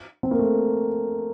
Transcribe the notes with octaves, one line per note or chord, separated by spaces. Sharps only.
C4
A#3
A3